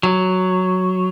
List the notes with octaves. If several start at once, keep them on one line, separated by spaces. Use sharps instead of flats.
F#3